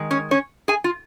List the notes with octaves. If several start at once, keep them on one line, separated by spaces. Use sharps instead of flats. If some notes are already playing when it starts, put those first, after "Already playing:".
Already playing: D#3 G#3
C#4 C#5
C#4 C#5
G#4 G#5
F4